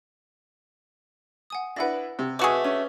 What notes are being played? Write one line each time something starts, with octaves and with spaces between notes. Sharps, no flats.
F#5 G#5 D#6
D4 E4 B4 F#5 A#6
C3
A3 F#4 G#4 B4 D#5 D6
C#4 D#7